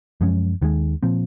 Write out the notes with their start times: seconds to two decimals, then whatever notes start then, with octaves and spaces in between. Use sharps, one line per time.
0.21 F#2 F3 G#3 C#4
0.62 D#2 D#3 G#3
1.03 A#2 F3 C4